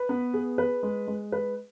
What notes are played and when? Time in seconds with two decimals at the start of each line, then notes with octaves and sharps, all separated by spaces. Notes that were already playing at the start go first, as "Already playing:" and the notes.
Already playing: B4
0.09 B3
0.34 G#4
0.58 B4
0.83 G#3
1.07 G#3
1.32 B4